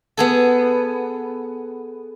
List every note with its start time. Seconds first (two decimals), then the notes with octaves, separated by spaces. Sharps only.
0.17 B3 G#4 A4